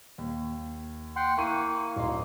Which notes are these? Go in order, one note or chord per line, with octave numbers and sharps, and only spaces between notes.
D#2
F#5 G5 C6
A#3 E4 C#6 D#7
D1 D#4 C6